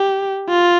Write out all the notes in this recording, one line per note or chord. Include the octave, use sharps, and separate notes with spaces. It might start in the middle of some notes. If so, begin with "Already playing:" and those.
Already playing: G4
F4